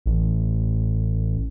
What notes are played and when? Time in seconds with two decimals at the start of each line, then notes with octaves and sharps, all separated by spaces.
0.06 A1